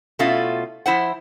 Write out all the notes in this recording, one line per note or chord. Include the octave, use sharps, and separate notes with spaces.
B2 A3 C#4 E4 F4
F3 E4 C5 F#5